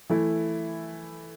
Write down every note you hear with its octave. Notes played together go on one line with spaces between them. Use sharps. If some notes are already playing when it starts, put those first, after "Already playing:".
E3 A3 E4